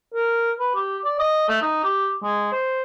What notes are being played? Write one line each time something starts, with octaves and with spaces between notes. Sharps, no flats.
A#4
B4
G4
D5
D#5
A3
D#4
G4
G#3
C5